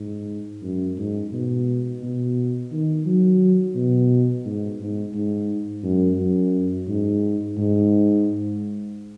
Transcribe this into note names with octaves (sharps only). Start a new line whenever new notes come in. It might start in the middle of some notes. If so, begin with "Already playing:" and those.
Already playing: G#2
F#2
G#2
B2
B2
D#3
F#3
B2
G#2
G#2
G#2
F#2
F#2
G#2
G#2